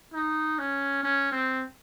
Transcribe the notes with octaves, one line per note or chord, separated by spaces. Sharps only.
D#4
C#4
C#4
C4